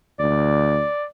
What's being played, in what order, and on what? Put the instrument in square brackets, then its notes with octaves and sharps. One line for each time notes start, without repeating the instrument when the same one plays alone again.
[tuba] D2 [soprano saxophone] D5